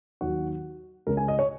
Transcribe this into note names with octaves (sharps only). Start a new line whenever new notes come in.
D#2 D#3 F#3 F#4
C#2 C#3 G#3 A#4
G#5
D#5
C#5